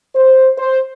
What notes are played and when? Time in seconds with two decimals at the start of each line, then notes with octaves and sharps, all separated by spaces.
0.16 C5
0.58 C5